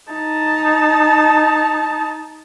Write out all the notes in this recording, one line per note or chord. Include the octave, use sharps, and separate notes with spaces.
D#4 A5